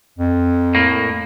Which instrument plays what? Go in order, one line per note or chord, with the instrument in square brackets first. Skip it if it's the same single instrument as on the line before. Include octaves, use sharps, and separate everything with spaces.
[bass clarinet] F2
[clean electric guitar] A2 A#3